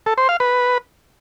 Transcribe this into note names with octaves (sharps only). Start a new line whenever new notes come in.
A4
C5
F5
B4